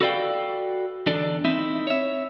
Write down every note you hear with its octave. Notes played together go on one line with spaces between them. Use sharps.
F#4 A4 B4 D5 F5 G5
E2 D3 D4 A4 D5
C4 D#4 E4 E5
C#5 E5